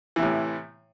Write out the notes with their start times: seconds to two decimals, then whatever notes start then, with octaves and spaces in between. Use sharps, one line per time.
0.16 E3
0.19 C3
0.23 A2